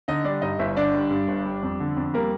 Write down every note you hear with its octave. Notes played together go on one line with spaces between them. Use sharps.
D3 D#4 D#5
G3 D4 D5
G2 D#4 D#5
G1 E4 E5
D3 D4 D5
G3
G2
G1
G3
F2
D3
F2
G3 A#3 A#4